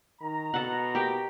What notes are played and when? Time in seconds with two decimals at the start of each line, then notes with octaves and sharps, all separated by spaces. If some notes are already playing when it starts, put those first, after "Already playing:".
0.22 D#3 A#5
0.54 B2 A4 F#5
0.95 G4 A#4 G5